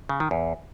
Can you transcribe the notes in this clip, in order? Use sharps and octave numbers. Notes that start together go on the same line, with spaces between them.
C#3
D#3
E2